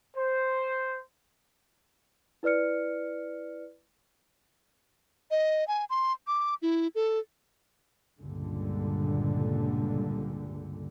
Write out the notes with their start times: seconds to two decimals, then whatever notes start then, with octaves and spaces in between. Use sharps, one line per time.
0.16 C5
2.43 E4 B4 D5 F6 C#7
5.31 D#5
5.68 G#5
5.90 C6
6.27 D6
6.62 E4
6.95 A4
8.21 C#2 G2 A#2 D3